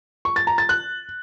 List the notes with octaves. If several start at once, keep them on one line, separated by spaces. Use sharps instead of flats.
C#6
A6
A#5
A6
F#6